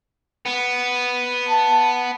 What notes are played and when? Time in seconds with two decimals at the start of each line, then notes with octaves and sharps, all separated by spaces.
0.46 B3
1.49 A5